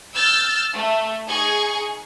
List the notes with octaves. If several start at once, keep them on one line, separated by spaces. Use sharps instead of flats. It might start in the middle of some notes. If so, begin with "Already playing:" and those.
E6 F6 G6 A6
A3
D#4 G#4 G#5 C#6 G#6